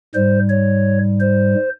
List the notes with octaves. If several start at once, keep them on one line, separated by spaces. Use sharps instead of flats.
G#2 G3 C5
C#5
C5